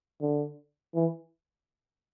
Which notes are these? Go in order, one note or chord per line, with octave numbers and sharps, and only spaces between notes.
D3
E3